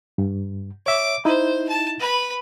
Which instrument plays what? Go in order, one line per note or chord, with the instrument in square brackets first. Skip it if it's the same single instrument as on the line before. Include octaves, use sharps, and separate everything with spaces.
[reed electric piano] G2
[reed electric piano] C#5 E5 [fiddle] D6
[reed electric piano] D#4 E4 [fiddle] C5
[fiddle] A5
B4 B5